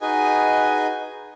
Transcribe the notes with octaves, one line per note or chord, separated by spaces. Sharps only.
D#4 F#4 G#4 B4 D#5 G#5